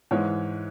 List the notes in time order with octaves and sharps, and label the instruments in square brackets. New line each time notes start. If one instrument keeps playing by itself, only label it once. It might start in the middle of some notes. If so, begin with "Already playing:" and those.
[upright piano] G#2 E3 G#3 C#5